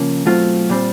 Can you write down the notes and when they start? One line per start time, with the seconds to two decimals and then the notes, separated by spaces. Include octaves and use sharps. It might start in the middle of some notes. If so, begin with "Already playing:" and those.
Already playing: C#3 F3 A#3 C#4
0.26 B2 F#3 A3 C4 F4
0.69 A#2 G3 C4